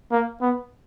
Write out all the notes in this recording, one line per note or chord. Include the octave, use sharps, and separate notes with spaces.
A#3
B3